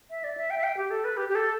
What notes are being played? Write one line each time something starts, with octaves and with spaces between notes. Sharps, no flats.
E5
D5
E5
G5
E5
G5
G4
A4
B4
G4
G4
A4